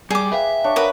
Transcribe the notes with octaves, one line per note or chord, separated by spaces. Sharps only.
G3 G#4 D6
B4 E5 F5 G5
D4 C#5 F5
A#4 B4 C#5 F#5 D#6